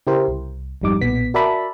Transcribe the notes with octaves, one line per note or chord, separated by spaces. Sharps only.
C#3 E4 G4 A#4 C5
C2
G#1 F2 G3 D#4 D6
B1 A#2 B3 B6
F#4 A#4 D5 E5 A5 B5